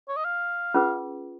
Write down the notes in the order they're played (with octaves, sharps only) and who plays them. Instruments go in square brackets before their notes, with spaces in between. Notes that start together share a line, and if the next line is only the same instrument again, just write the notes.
[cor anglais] C#5
D#5
F5
[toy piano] C#4 F4 G#4 B4